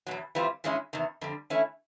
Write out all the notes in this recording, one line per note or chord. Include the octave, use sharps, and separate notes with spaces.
E2 B2 F#3
E3 G3 C4 F4
G2 E3 G#3 C#4 E4
E2 C3 D#3
F2 D3 G3
E3 A3 C#4 E4